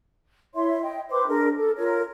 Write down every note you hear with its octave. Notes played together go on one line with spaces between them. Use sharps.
E4 C#5 E5 C6
D#5 G5
B4 C5 C6 D6
D4 G#4 A#4
A4
F4 A#4 C#5